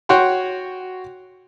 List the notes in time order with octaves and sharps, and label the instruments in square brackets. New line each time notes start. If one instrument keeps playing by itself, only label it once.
[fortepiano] F#4 C#5 F#5 G5 C6